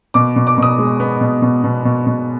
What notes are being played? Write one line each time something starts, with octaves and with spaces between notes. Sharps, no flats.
B2 D6
B2
D6
B2 D#6
G#3
B3
B2
B2
B2
B2
B2